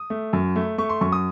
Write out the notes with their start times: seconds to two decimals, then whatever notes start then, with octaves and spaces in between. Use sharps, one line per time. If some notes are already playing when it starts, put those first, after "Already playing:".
Already playing: D#6
0.10 A3
0.33 F#2
0.56 A3
0.78 A3 C#6
0.89 C6
1.01 F#2 C#6
1.12 D#6